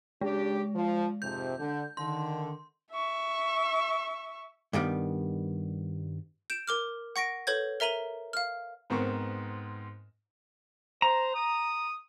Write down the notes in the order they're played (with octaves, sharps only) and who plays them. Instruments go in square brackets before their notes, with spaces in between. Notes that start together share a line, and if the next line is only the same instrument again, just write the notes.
[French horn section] C#3 D4 G4 [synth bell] G#3
[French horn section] F3
[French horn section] F2 G#2 C3 [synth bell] G6
[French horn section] D3
[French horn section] D3 D#3 [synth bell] C6
[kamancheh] E5 C#6
[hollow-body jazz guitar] G2 D#3 G3 B3
[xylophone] G6 D7 E7
A#4 D6 F6
F#5 C#6 A#6 D7
A4 B4 C#5 G6 G#6
A#4 E5 A#5 D#7 F#7
F5 F6
[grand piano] G#2 B3 C4 A#4 C#6
[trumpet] C5 [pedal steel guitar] A#5
[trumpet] D#6